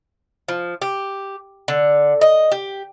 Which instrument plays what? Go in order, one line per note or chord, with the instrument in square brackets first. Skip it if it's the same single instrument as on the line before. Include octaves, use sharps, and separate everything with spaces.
[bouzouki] F3
G4
D3
D#5
G4